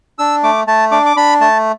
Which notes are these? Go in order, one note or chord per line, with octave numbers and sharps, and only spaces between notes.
D4 E6
A3 D6
A3 A5
D4 D6
D6
D4 B5
A3 A5